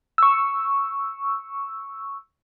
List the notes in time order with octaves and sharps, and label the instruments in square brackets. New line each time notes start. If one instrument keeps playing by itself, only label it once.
[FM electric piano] C#6 E6